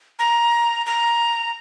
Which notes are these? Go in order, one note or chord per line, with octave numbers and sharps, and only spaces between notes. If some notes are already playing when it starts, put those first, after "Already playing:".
A#5
A#5